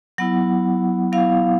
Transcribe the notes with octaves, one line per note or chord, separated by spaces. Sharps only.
F#3 B3 E4 F#5
F#3 B3 E4 F5